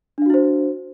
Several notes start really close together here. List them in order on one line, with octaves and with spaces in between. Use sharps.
D4 F5 F#4 E4 C5